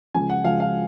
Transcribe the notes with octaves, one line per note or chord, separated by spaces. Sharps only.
C#2 C#3 F3 G#3 G#5
F#5
C#2 C#3 F3 G#3 F5
F5